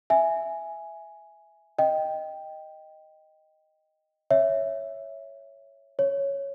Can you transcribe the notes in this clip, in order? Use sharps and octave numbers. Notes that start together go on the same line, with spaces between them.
E5 G#5
D#5 G5
C#5 E5
C#5